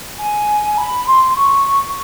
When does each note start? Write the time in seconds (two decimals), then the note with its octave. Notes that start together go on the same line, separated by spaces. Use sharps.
0.18 G#5
0.77 B5
1.06 C6
1.35 C#6